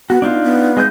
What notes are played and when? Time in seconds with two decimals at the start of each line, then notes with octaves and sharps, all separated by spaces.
0.10 B3 F#4
0.22 B3 D4 D#4 F4
0.43 B3
0.77 G#3 D#5 G6